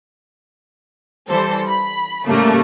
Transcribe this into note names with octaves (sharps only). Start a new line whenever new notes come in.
E3 G3 A4 C5
B5
A2 C#3 G3 A3 A#3